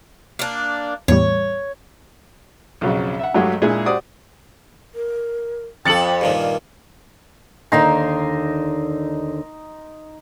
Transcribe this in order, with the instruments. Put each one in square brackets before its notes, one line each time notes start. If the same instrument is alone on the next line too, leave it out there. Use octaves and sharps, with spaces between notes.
[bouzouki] A#3 D4
[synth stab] E2 A2 G3 [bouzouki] C#5
[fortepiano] B1 F2 C#3 F#3
E5 F#5
G2 F#3 G#3 A3 F#4 G4
A#2 G#3 D4 E4 G#4
F#4 G4 C5 D5 F#5 D#6
[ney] A#4
[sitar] F2 A4 [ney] G5 [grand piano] A6 C#7 F#7
[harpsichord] G2 A#2 D#3 [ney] F5
[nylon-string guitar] D#2 D3 D#3 [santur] D#4 A#5 C6